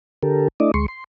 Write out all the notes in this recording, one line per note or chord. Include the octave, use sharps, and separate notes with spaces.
D3 G4 A4 A#4
A3 D4 E4 D5 D#5
D2 G#3 C6 C#6
C6